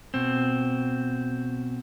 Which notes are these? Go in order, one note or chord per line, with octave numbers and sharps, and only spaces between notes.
B2 C4